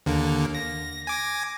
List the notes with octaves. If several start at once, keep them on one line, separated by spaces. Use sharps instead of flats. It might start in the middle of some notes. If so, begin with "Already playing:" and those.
D#2 D3 A#3
A#6
G#5 D6 A#6